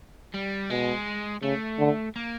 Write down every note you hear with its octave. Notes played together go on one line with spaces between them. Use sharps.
G3
B2 G#3
C#3 A3
D3
A#3